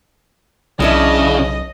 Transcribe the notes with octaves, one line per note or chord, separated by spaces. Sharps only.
B1 C#3 E3 D4 D#5 E5